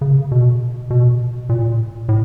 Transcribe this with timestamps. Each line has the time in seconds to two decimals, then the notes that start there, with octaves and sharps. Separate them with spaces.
0.01 C#3
0.31 B2
0.90 B2
1.49 A#2
2.09 A2